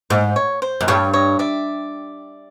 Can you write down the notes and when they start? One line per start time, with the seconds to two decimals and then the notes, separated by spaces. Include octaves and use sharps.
0.10 G#2 C5
0.36 C#5
0.62 C5
0.81 F#2
0.88 G2 C#5
1.13 C#5 D#5
1.39 D5 E5